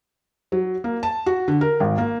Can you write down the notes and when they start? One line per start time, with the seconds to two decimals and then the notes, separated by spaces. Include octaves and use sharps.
0.52 F#3
0.84 A#3
1.03 A5
1.26 F#4
1.48 D3
1.61 A#4
1.80 G#1
1.98 A#3